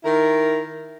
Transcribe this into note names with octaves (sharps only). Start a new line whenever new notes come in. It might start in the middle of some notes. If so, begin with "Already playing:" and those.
D#3 E4 A#4